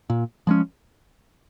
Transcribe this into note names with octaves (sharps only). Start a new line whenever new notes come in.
A#2
F3 G#3 C#4